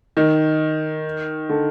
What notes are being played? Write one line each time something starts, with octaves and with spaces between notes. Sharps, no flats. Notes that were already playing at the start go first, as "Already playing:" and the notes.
D#3
D3